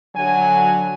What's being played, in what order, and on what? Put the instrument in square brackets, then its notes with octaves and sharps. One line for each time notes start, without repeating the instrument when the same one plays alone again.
[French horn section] D3 F#3 [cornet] G#5